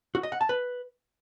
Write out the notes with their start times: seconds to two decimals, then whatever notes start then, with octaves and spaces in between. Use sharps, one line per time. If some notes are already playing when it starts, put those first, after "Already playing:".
0.15 F#4
0.23 D#5
0.32 F#5
0.41 A5
0.49 B4